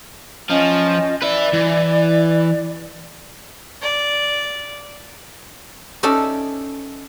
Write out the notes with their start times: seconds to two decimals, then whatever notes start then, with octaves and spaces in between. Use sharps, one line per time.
0.50 F3 C#4 F4 D#5
1.22 B4 D5 E5
1.53 E3
3.82 D5
6.03 C#4 D#4 A4 D5 E5